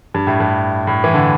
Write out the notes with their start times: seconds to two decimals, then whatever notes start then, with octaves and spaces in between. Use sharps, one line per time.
0.14 G2
0.27 A2
0.40 G2
0.87 A2
1.04 E3
1.14 D3